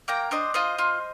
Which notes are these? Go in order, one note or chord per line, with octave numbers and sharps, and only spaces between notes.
A#3 G5 A#5
D4 C5 D#5
F4 C5 D#5
F4